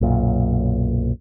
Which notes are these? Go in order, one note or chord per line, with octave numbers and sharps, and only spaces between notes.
B1 F#2 A#2